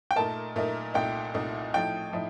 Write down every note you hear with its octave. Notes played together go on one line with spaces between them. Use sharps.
G5
A#2 A3 D#4 A#4 A5
A#2 A3 D#4 A#4
C2 A#2 A3 D#4 G5
C2 A#2 A3 D#4
A2 F3 A3 D#4 G5
A2 F3 A3 D#4